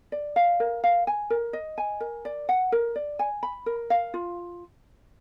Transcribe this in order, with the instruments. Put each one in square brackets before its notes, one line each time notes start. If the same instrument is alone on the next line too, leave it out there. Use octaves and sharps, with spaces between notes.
[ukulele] D5
F5
A#4
F5
G#5
A#4
D#5
G#5
A#4
D5
F#5
A#4
D5
G#5
B5
A#4
F5
F4